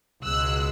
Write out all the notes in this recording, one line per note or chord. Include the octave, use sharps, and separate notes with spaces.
C#2 B2 G#3 E6 F#6